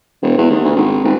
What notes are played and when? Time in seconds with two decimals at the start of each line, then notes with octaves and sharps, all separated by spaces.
0.22 E1
0.38 E2
0.50 D#2
0.65 D2
0.76 G#1
1.05 D#1